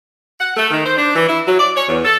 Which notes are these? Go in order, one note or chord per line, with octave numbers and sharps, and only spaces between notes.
F#5
A3
D#3
C5
D4
E3
E4
F#3
D5
C#5
E2
A4